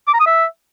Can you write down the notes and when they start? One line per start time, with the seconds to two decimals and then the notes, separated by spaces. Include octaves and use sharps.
0.07 D6
0.14 A#5
0.20 D#6
0.26 E5